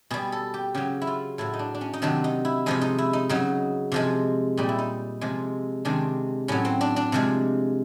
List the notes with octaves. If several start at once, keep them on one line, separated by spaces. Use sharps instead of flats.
B2 G3 G#4
A4
G4
C#3 F#3 G4
E4
F4
A2 F#3 E4
D#4
D4
D4
C#4
D#4
C3 D#3 F#3 D4
D#4
E4
C3 F3 G#3 D#4
D#4
E4
D#4
C#3 F#3 D#4
C3 F3 G#3
A#2 G3 D#4
E4
D#4
C3 F3 G#3
C3 D#3 G#3 D4
A2 F#3 C#4
C4
D4
D4
C3 F3 G#3